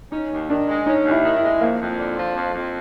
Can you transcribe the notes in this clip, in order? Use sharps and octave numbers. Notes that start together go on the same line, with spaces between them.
C#4 D#4
D#2
D#3 D4
G#3
C#4 D#4
D#2
E4
D#3
E4
G#3
F2 A#3
F2
D3
F3
F2
F2